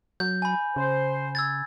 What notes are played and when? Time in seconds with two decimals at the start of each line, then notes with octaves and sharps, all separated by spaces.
0.20 F#3 G6
0.42 G#5 B5
0.76 C#3 C5
1.35 E6 G#6 A6